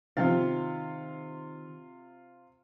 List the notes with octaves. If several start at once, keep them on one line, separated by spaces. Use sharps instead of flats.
C3 D#3 F3 F4 F5 G5 A6